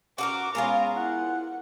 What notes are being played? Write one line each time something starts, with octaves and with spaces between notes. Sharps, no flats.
C#4 F#4 A4 A#4 D6
G#3 B3 C#4 F4 G#4 A#4 F5 A#5
E4 F#5